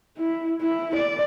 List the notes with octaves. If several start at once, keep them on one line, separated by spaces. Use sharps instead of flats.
E4
E4
D5